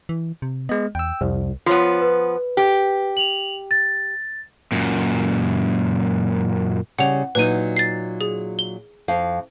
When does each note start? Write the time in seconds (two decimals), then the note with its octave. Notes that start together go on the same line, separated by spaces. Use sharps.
0.09 E3
0.42 C3
0.69 G#3 B3 D#5
0.95 E2 G5 E6
1.21 C2 F2
1.66 F3 B3 F4 C#5
2.02 B4
2.57 G4
3.17 F7 F#7
3.71 A6
4.72 F#2 A#2
6.99 C#3 G3 F#5 F7
7.35 A#2 F#3 D#4 B4 D#7
7.77 A6 C7
8.21 G#4
8.59 G7
9.08 F2 F5